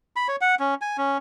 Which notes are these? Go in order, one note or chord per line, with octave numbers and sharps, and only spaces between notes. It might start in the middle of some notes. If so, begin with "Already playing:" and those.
B5
C#5
F#5
C#4
G#5
C#4